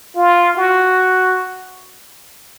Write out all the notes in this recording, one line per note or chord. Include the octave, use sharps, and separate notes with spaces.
F4
F#4